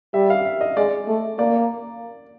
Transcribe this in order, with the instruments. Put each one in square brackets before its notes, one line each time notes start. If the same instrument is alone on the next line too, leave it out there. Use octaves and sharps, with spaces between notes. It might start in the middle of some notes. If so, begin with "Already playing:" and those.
[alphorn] G3 [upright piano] E5
[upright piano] F5
E5
D#5
[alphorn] G#3 [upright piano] D5
[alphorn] A3
[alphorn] A#3 [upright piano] D5